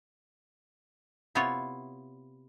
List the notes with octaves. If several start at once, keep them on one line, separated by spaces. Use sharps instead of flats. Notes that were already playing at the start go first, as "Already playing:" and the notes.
C3 B3 E4 F4 C#5